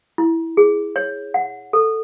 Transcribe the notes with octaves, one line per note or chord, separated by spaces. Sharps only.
E4
G#4
C#5
F#5
A4